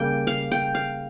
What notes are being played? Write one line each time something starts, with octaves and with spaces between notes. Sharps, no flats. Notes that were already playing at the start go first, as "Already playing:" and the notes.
Already playing: C#3 G3 A#3 G5
F5
G5
F5